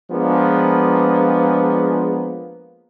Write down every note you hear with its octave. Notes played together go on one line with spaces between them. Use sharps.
F3 G#3 A#3 B3 D4